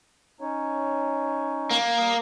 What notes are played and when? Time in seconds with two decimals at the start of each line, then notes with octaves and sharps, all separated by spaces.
0.41 C#4 D#4 C#5
1.71 A#3
1.98 G3 D#6